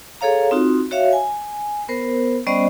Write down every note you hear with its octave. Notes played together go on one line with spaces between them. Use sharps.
G#4 A4 C#5 F5 A#5
C4 D#4 F4 F#4
F#4 C#5 E5 F5
G#5
B3 A#4 C5
G3 B3 C#4 C5 D5 D#5